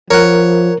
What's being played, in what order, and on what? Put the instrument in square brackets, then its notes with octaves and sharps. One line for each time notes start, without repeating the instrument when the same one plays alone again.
[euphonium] F3 [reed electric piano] A#4 [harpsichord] C#5 F#5